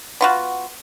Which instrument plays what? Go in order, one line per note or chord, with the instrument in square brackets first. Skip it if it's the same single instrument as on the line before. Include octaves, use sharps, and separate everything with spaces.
[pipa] B3 F4 F#4